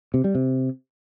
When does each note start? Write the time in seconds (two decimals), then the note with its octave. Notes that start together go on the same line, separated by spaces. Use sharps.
0.14 C3
0.24 G3
0.35 C3